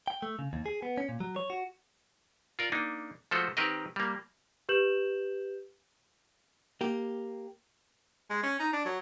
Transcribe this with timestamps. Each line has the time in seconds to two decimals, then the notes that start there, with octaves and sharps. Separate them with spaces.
0.08 G5
0.22 A3
0.39 C#3
0.53 D#2
0.66 G#4
0.82 B3
0.98 C#4
1.09 A#2
1.20 F#3
1.36 C#5
1.50 F#4
2.59 F4 A#4 D5
2.72 A#3 D4 D#4
3.31 F3 G#3 A3 F#4 A4 C5
3.57 D#3 C4 G4 A#4 B4 D#5
3.96 G3 A#3
4.69 G4 B4 G6 E7 F#7
6.81 A#3 G4
8.30 G#3
8.43 C#4
8.60 D#4
8.73 D4
8.85 F#3